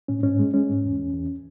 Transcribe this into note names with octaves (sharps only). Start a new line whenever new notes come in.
A2 C#4
G#2 C#4
G#3
G#3 C#4
G#2
E2
E2
E2